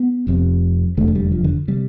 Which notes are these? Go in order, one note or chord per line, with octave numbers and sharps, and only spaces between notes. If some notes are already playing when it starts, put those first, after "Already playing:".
Already playing: B3
F1 F2 C3
F1 E2 D3 A3
A3
G3
F3
D3
C3 G3